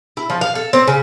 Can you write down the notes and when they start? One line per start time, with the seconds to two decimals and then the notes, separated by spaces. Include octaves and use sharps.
0.17 E4
0.30 F3
0.41 F5
0.55 A4
0.73 C4
0.87 C#3